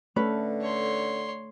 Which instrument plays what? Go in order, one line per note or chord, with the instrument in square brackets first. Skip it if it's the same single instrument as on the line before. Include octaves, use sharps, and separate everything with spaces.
[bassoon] D3 [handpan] A3 A4 [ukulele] C#4 B4
[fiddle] C#5 C6